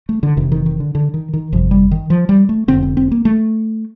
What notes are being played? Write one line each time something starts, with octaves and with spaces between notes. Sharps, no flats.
A3
D3
F1 F2 C3 D#3
D#3
D#3
D3
D3
D#3
D#3
G1 F2 C3 F3
G3
D#3
F3
G3
A3
F1 D#2 D3 C4
C4
C4
A#3
A3